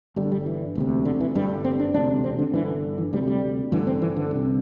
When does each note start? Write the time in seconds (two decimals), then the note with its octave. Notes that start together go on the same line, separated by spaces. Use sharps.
0.16 G1 G2 D3 G3
0.32 G3
0.46 E3
0.75 E1 D2 C3
1.05 D3
1.20 E3
1.35 G1 G2 D3 G3
1.64 C4
1.80 D4
1.94 E1 D2 C3 D4
2.24 C4
2.39 D3
2.54 G1 G2 D3 E3
2.98 E3
3.13 D2 G3
3.17 C3
3.28 G3
3.72 A1 G2 D3 E3
3.87 C4
4.02 E3
4.16 D3
4.31 C2 C3